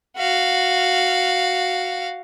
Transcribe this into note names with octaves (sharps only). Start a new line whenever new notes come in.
F#4 F5